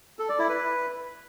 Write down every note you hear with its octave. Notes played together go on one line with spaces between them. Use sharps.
A4
D5
E4
B4